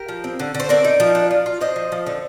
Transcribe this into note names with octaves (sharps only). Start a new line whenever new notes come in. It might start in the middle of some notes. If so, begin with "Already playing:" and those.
Already playing: G4 A#4
F3
C4
D3
D3
C5
C4 A#4 D5
D#4
F3
D4
F4
F4
D4 C5 D#5
F3
F3
D3